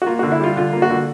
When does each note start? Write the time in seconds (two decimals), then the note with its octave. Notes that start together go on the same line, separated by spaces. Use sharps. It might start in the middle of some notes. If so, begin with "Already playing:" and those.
0.02 F#4
0.06 A#3 F4
0.19 D3 F#4
0.32 E4
0.40 G3 F4
0.56 D3 F4
0.73 A#3
0.82 F#4
0.90 D3